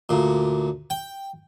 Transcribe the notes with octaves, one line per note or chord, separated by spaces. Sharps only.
D2 A#2
G5